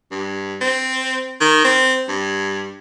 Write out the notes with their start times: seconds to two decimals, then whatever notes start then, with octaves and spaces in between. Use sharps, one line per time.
0.11 G2
0.61 C4
1.40 D#3
1.64 C4
2.08 G2